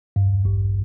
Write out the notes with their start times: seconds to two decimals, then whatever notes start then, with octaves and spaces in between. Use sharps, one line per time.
0.16 G2
0.45 A1